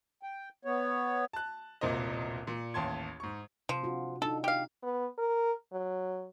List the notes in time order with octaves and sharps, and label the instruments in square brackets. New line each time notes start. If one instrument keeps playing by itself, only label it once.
[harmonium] G5
B3 C#5
[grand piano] A5 F#6
E1 C2 A#2 A#3 C5 D#5
A#2
A1 D#2 A5 C6 G#6
G#2 C#6
[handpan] C3 [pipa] F3
[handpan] D4 F4 F#4
[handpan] D4 D#4 [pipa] A4
[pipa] G4 F5
[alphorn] B3
A#4
F#3